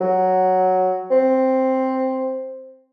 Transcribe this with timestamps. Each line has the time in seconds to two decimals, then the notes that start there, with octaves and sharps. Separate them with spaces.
0.01 F#3
1.11 C4